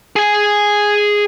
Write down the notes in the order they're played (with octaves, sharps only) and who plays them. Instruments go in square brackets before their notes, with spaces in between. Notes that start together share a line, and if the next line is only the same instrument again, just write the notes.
[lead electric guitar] G#4 G#5